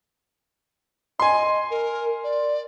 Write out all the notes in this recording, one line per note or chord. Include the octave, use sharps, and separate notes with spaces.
D#5 G#5 C6
A#4
D5